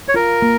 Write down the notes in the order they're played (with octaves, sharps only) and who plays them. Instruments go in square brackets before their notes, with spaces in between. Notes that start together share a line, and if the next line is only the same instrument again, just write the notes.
[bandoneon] C#5
[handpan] F4 [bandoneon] A#4
[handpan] A#3